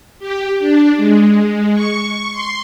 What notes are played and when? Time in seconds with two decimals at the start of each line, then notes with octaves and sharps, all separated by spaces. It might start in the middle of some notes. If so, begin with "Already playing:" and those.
0.19 G4
0.59 D4
0.97 G#3
1.74 C#6
2.31 C6